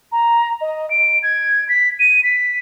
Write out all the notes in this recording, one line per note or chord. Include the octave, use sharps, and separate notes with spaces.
A#5
D#5
D7
G#6
B6
D#7
B6